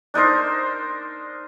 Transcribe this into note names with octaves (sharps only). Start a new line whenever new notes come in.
D4 D#4 A#4 C5